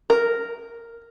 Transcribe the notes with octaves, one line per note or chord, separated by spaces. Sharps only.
A#4